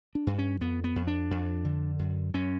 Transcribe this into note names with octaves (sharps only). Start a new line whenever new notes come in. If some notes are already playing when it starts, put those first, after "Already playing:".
D4
G2
C#4
F2 B3
B3
F2
D4
F2
D3
F#2
F#2 C#4